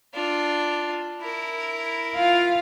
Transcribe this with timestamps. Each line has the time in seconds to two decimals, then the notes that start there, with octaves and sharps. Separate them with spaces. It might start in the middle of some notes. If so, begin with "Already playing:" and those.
0.14 D4 F4
1.21 E4 A#4
2.16 F4 F5